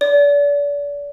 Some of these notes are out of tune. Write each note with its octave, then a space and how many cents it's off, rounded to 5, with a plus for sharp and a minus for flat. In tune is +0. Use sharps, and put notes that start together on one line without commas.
D5 -35